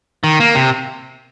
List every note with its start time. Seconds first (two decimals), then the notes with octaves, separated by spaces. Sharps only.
0.24 D#3
0.40 A#3
0.55 C3